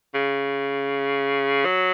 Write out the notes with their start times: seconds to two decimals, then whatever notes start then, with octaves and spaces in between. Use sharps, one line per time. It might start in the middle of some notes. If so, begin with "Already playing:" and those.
0.14 C#3
1.65 F#3